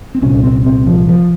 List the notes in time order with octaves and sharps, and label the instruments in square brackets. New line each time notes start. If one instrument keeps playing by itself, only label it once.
[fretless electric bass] C4
C2 A#2 C#4
C4
C4
F3
F3